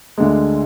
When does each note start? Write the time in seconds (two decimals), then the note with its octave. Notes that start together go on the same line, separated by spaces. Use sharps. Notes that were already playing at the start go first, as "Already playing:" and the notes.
0.18 D2 D3 G#3